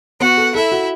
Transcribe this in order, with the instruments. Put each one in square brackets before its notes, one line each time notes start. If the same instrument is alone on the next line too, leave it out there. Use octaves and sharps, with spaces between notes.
[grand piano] B3 [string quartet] F#4 F#5
[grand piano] A4
[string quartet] E4 E5 [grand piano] A4
[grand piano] F#4